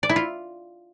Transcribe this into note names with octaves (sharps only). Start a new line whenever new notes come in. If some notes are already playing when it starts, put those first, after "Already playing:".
D5
E4
F4